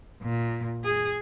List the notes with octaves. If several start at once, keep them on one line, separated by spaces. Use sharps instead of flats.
A#2
G#4